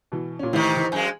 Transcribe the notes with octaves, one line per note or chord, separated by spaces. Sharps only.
B2 E3
A#2 C#4
A1 A2 C3 D#3 E3
E3
F#2 G#3 G#5